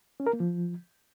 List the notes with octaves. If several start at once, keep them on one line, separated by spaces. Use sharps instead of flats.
C#4
A#4
A#3
F3